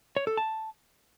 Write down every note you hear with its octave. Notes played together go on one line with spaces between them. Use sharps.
C#5
A4
A5